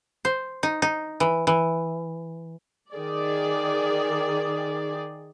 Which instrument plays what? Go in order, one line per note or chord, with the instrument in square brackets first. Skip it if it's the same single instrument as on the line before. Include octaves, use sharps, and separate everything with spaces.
[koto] C5
D#4
D#4
E3
E3
[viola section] D#3 G#4 D5